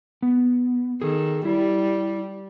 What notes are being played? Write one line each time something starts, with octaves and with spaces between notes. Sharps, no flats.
B3
D#3 G#4 A4
G3 E4